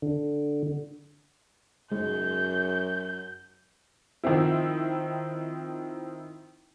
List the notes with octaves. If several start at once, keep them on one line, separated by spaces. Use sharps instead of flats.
D3
F#2 G#3 G6
D#3 F3 C4 E4